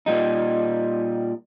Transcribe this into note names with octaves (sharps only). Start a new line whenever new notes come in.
A#2 G3 D#4